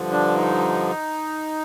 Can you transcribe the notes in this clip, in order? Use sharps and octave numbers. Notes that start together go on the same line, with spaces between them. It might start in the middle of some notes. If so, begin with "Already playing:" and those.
Already playing: G2 D3 F3
D4
D#4